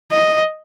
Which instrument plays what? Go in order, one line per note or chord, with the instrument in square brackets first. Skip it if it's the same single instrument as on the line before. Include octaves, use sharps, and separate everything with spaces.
[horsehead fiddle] D#5